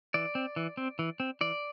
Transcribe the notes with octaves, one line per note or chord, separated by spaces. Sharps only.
E3 D5
C4
E3
C4
E3
C4
E3 D5